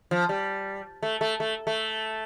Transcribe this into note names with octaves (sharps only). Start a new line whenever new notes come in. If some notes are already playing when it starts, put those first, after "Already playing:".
F3
G3
A3
A3
A3
A3